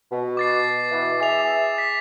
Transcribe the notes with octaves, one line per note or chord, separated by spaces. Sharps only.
B2
D6 A6 C7
B2 E3
G#4 E5 D6 F7
B6